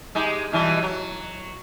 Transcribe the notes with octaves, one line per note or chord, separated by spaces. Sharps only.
G#3 D#4 G4
B2 E3 G3
F#3